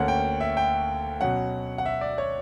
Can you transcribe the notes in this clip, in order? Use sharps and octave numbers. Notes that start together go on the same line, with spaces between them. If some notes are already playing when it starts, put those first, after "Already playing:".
Already playing: D2 D3 A#3 C#4 F#5
G5
E5
G5
B2 F#3 C#4 F#5
F#5
E5
D5
C#5